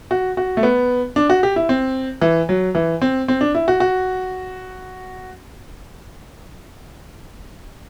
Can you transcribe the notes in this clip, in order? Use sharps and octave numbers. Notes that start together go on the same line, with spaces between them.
F#4
F#4
A3
B3
D4
F#4
G4
E4
C4
E3
F#3
E3
C4
C4
D4
E4
F#4
F#4